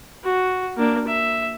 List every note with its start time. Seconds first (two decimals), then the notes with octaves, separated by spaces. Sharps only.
0.24 F#4
0.77 A#3 D4
1.07 E5